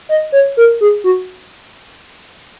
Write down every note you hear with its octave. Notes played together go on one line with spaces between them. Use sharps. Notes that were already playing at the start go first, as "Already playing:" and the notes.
D#5
C#5
A#4
G#4
F#4